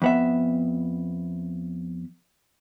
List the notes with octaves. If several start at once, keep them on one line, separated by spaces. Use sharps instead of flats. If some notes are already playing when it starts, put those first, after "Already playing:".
F2 B3 E5